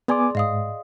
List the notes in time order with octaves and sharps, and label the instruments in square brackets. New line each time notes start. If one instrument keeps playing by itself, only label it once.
[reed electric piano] B3 G#5 D6 [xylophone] G#4 D5 C6
[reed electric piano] G#2 [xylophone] D#5 F5 D#6